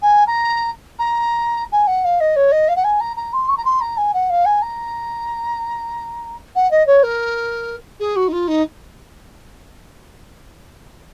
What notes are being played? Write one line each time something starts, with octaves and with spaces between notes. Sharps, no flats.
G#5
A#5
A#5
G#5
F#5
F5
D#5
C#5
D#5
F5
F#5
G#5
A#5
A#5
C6
C#6
A#5
C6
A#5
G#5
F#5
F5
G#5
A#5
F#5
D#5
C#5
A#4
G#4
F#4
D#4
F4
D#4